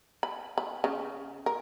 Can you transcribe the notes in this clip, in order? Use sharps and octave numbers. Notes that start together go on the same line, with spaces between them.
B5
B5
C#3
A#4